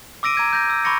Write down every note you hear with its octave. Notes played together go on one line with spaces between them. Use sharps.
D6 E6 A#6 D7 D#7
A#5 G#6 D#7
G6 A#6
E6
B5 C#6 D6 A#6 C#7